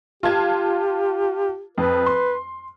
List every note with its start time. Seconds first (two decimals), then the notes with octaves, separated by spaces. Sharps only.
0.23 F4 G4 A5 G#6
1.78 F2 B4
2.06 C6